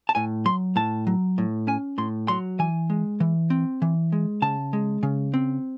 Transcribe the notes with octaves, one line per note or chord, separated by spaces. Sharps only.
A5
A2 G#5
F#3 C6
A2 A5
F#3
A2
C#4 G#5
A2 C6
F#3 C6
E3 G#5
G#3
E3
C4
E3
G#3
C#3 A5
G#3
C#3
C4